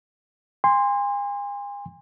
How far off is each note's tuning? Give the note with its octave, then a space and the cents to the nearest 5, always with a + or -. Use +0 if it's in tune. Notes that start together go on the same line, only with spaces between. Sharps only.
G#5 -40 C6 +0